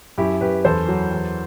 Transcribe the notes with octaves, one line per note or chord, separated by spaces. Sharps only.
F#2 E4 G4
F#2 G4 B4
E2 A4 C5
F#3
E2